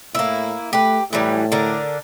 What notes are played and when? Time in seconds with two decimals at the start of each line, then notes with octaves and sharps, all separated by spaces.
0.15 A2 A#3 E4
0.73 A3 G4 B4
1.13 A2 E3 F#3 G3
1.52 D3 D4 A#4